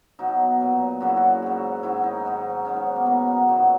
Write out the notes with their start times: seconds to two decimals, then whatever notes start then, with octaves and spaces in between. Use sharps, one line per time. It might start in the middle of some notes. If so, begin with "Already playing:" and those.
0.19 B2 F#3 D#4
0.60 A#2 F#3
1.01 F#2 C#3 F#3 F#4
1.09 E4
1.17 F#4
1.42 G#2 F#3
1.83 G#2 D#3 F#3 E4
2.04 D#4
2.25 G#2 D#3 F#3
2.65 G#2 D#3 F#3 C#4
2.76 B3
2.86 B3
2.96 A#3
3.06 B2 F#3 A#3
3.27 B3
3.48 A#2 F#3 D#4